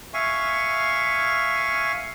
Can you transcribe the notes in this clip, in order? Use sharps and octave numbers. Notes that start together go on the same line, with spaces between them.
E5 F5 G#5 C#6